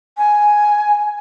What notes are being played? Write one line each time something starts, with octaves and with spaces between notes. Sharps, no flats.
G#5